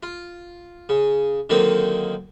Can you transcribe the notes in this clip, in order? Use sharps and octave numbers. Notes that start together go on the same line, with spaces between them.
F4
C#3
D3 D#3 F#3 A#3 C4 D#4